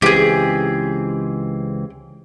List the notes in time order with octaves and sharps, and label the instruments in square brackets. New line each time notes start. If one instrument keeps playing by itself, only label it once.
[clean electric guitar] C#2 E3 C4 [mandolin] G4 G#4